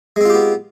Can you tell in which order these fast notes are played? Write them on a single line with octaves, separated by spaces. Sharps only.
G#3 C4 F4 G4 B3